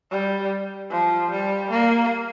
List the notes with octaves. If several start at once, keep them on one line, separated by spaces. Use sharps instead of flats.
G3
F3
G3
A#3